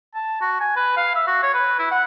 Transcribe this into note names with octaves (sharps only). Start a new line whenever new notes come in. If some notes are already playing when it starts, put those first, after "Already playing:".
A5
F#4
G#5
B4
F5
E5
F#4
C#5
B4
E4
F#5